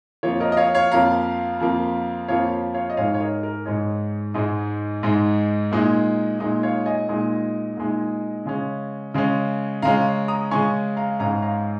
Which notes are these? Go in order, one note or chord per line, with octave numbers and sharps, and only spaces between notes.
F2 F3 A#3 C#5
A#4 D#5
D#5
C#5 F5
C#5 F5
F2 F3 A#3 F5 A#5
F2 F3 A#3
F2 F3 A#3 C#5 F5
C#5 F5
D#5
G#2 G#3 D#4 C#5 F5
C#5
A#4 D#5
A#4
G#2 G#3 D#4 C#5
G#2 G#3 D#4
G#2 G#3 D#4
A#2 G#3 D#4
A#2 G#3 D#4
C#5 F5
D#5 G#5
A#2 G#3 D#4
A#2 G#3 D#4
C#3 G#3 C#4
C#3 G#3 C#4
C#3 G#3 C#4 F5 A#5
A#5 D#6
C#3 G#3 C#4 G#5 C#6
F5 A#5
G#2 G#3 C#4 F5 A#5
F5 A#5